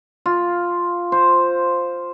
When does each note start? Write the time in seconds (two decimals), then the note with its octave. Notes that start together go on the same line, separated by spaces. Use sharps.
0.26 F4
1.12 C5